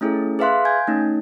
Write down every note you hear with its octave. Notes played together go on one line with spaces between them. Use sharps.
A3 C#4 E4 G#4 A4
G#4 B4 E5 F5 C6 F#6
G#5 G6 G#6
A3 C#4 D#4